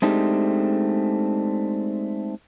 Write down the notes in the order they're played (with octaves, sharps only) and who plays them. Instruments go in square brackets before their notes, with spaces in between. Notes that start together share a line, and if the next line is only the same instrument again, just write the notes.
[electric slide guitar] G#3 A3 C4 D4 D#4 G4